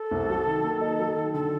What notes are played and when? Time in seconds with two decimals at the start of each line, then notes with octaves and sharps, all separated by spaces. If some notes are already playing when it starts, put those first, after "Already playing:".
Already playing: A4
0.11 C2
0.29 F#3
0.46 D#3
0.64 A#3
0.81 D#4
0.99 F#3
1.16 D#3
1.34 D3 A4